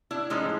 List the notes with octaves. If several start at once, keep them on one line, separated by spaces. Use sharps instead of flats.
D4 E4
A2 F3 G#3 C#4 D#4